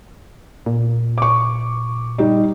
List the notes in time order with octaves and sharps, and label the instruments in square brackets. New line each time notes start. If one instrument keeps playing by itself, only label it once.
[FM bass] A#2
[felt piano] C#6 D6
G3 D#4